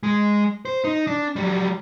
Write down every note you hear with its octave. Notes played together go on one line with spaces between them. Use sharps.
G#3
C5
D#4
D4
F#3 G3